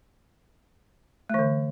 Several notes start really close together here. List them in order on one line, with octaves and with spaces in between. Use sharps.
A3 E3 D3